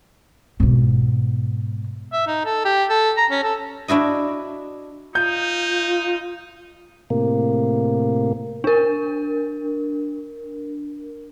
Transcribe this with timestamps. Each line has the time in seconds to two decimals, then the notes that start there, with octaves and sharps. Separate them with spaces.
0.60 G#2 B2
2.12 E5
2.27 D#4
2.45 A4
2.65 G4
2.90 A4
3.17 A#5
3.30 C#4
3.43 A4
3.88 D4 E4 F#4 D#5
5.15 D#4 F4 G6
7.10 A2 C3 A#3
8.64 D4 A#4